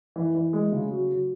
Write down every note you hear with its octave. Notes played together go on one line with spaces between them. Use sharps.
E3
E3
G#3
C#3
F#3
F#3